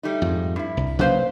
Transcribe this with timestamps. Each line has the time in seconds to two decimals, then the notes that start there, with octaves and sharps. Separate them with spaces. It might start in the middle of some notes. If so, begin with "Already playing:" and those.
0.03 G3 A3 D#4
0.22 F2 G#2
0.56 G2 E4
0.77 C2
0.99 C#3 F#3 A#3 B4 C5 F5